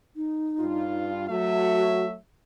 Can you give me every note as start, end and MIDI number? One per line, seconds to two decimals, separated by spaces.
0.16 1.10 63
0.60 1.30 43
0.60 1.30 65
1.30 2.14 54
1.30 2.14 57
1.30 2.05 66
1.30 2.17 76